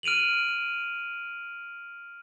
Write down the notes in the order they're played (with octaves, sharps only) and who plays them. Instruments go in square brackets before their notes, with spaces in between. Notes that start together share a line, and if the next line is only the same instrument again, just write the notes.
[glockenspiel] F6 D7 D#7 F7 F#7